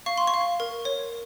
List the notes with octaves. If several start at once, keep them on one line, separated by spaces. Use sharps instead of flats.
F5 C#6
C6
C#6
F5
A#4
C#5